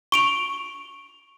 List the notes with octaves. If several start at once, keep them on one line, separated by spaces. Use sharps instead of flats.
C#6 D7 F7